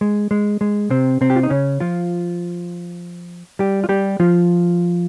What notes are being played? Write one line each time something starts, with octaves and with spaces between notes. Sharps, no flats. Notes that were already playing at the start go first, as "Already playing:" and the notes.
G#3
G#3
G#3
C3 C4
C3 C4
G4
F4
D#4
C#3 C#4
F3 F4
G3 G4
F4
G3 G4
F3 F4